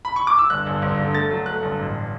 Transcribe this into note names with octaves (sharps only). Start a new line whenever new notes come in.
B5
C#6
D6
E6
G1 F#6
G1
G1
D3
A3 A6
F#3
A3 F#6
G1
A1